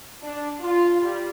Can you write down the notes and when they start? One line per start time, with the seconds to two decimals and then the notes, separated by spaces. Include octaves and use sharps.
0.23 D4
0.60 F4
1.01 G3